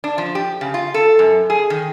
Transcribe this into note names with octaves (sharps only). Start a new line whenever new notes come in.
D4
F3
G4
C#3
F4
A4
F#2
G#4
D#3